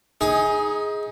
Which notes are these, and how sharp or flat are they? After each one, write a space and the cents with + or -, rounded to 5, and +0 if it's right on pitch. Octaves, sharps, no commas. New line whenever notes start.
D#4 +25 G#4 +0